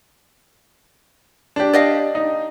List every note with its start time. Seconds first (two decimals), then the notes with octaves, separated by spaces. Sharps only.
1.56 D4 G4
1.73 D5 D#5 F5
2.15 D#4